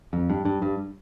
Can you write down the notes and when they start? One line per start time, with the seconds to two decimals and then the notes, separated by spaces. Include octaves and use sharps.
0.13 F2
0.30 G2
0.45 G2
0.62 G2